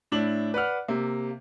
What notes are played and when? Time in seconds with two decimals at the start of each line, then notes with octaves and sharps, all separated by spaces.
0.12 A2 D4 E4 F#7
0.54 B4 D5 F#5 F6
0.88 C3 A#3